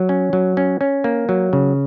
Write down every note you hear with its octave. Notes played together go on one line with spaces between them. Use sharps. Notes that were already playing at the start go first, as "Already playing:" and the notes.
Already playing: F#3
C#4
F#3
C#4
C#4
A#3
F#3
C#3